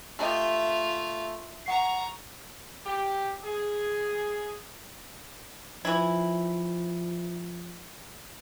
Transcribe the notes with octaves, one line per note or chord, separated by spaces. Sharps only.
A3 F4 G4 D#5 E5
F#5 A#5 C#6 C7
G4
G#4
E3 F3 E4